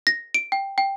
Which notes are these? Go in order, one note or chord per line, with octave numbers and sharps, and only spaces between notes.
A#6
D7
G5
G5